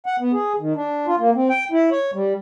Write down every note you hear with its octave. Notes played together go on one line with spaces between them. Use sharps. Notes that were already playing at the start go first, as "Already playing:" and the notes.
F#5
B3
G#4
D#3
D4
F4
A#3
C4
G5
E4
C#5
G3